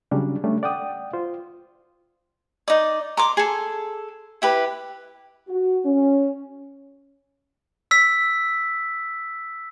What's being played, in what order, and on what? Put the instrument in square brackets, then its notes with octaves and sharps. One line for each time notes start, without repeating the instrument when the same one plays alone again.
[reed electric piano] C#3 F#3 G3 C#4 D4
G3 A3 C#4 D4
D5 F#5 G5 D#6
F4 C5
[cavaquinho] D#4 D5
A#5 C6 D6
G#4 A4
E4 G4 B4
[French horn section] F#4
C#4
[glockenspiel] E6 B6